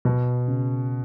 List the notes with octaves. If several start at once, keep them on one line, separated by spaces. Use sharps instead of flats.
B2
C#3